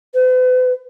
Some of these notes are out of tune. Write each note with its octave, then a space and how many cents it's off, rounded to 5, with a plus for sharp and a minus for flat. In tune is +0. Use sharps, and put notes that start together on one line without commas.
B4 +45